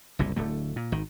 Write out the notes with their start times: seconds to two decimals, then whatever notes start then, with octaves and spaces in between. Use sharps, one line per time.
0.19 F#1 C2 A#2
0.36 D1 D3 A3
0.76 A#2
0.92 G#1 D#3